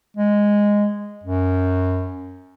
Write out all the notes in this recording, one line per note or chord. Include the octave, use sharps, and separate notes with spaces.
G#3
F#2